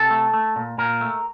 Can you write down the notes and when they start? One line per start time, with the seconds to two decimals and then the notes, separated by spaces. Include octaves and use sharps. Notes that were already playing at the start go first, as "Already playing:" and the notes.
Already playing: C3 A4
0.11 A3
0.33 A3
0.56 A#2
0.78 A#2 A#4
1.01 A3